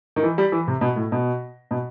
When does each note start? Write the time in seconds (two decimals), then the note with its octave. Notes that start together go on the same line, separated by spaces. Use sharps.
0.16 D#3
0.23 E3
0.38 G3
0.52 E3
0.68 C3
0.81 B2
0.96 A2
1.12 B2
1.71 B2